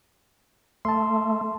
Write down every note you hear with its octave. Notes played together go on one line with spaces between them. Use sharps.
A3 A5 C6